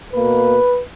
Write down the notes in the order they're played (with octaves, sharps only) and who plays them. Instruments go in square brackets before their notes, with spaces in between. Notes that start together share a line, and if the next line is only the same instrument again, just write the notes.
[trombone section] B2 A#3 B4